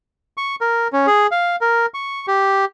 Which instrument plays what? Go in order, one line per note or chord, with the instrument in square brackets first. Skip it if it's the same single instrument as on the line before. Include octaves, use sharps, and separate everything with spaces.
[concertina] C#6
A#4
C#4
G#4
F5
A#4
C#6
G4